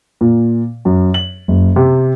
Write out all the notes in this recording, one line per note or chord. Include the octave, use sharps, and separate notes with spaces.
A#2
F#2
F#7
F#1
C3